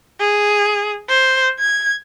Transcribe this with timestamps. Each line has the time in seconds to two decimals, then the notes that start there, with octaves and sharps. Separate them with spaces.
0.20 G#4
1.09 C5
1.60 G#6